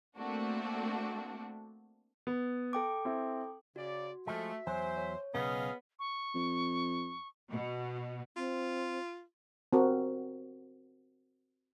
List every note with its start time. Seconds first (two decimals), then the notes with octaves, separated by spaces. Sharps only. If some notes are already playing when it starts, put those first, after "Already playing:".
0.17 A3 A#3 C4 D4 F#4
2.27 B3
2.73 A4 G5 D6
3.05 C4 E4
3.76 C#3 F#4 D5
4.27 F3 G#3 A3 E5
4.67 E2 F#3 C5 C#5 G#5
4.97 C#5
5.34 B1 C#3 B3 G#4 D#5 F5
5.99 C#6
6.34 F2
7.51 B2
8.37 C4 F4
9.73 C4 F#4 A#4